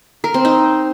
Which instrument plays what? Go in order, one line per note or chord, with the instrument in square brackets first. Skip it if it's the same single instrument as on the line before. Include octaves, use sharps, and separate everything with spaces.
[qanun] A#4
C4
D#4